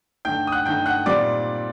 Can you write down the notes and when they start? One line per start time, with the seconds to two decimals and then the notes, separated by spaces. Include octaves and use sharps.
0.25 G2 D3 A3 D#4 G5 G6
0.47 D#6
0.52 F#5 F#6
0.65 G2 D3 A3 D#4 G5 G6
0.86 F#5 F#6
1.06 A#2 G3 C4 D#4 D5 D6